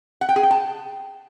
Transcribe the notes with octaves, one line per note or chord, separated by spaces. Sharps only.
F#5
G5
G#4
G5
A5